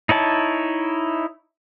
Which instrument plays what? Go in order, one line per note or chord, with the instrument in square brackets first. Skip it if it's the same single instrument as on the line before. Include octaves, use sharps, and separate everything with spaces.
[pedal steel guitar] D#4 E4 C#5 A5